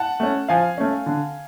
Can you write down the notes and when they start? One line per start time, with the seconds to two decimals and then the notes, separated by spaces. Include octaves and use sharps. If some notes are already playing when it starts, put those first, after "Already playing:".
Already playing: F#5 A5
0.20 A3 C#4
0.48 F3 F5 G#5
0.78 A3 C#4
1.06 D3